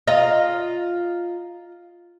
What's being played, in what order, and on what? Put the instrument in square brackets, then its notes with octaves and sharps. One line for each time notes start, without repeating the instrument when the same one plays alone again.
[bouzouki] F4 A#5 [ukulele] D#5